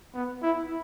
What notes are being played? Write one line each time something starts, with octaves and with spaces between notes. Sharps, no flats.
B3
E4